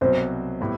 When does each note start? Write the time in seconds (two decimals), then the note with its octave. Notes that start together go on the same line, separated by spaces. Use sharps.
0.01 C2 B2 F#3 C5
0.60 A2 G3 B3 E4